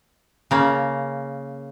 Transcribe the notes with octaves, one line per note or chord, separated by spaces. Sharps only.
C#3 A#3